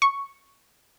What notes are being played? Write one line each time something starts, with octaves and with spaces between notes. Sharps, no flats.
C#6